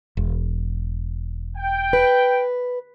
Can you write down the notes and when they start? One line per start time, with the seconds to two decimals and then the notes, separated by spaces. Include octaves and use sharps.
0.17 E1
1.57 G5
1.93 B4